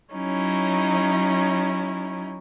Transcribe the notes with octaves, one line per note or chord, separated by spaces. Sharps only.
F#3 C#4 D#4 E4